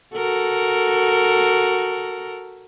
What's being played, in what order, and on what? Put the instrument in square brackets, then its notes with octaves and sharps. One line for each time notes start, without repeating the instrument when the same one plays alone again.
[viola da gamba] F#4 A4 A#4